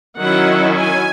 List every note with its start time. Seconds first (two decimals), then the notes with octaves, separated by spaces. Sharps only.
0.19 D#3 F#3 C#4 E4 F#5
0.77 G#5